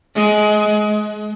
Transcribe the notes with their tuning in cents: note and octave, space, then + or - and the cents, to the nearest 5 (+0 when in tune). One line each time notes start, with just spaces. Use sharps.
G#3 +25
G#3 +40